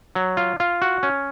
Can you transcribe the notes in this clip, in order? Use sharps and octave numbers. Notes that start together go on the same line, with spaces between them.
F#3
F4
F4
F#4
C#4